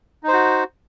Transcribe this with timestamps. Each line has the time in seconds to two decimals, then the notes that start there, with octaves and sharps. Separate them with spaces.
0.23 D#4
0.28 C5
0.33 F#4